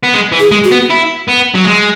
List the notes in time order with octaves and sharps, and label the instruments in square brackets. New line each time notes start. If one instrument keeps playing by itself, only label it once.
[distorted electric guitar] B3
G#3
E3
[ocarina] G#4
[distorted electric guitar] G#3
[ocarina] F#4
[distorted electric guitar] B3
E4
B3
F#3
G#3